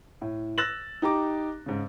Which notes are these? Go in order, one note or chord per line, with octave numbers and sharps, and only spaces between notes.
A2
E6 F#6 A6 A#6 E7 F#7
D#4 G4 A#5 D6
G#2 C#3